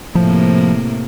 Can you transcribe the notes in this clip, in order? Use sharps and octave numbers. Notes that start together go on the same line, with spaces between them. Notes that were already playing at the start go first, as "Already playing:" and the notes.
A2 C3 F3 A#3